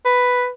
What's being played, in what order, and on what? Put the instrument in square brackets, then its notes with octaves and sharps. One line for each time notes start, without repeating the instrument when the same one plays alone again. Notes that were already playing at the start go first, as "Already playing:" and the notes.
[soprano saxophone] B4